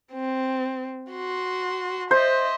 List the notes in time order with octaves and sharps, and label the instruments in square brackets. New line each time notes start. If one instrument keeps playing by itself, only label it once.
[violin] C4
F#4 C6
[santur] C5 [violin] D#5 E5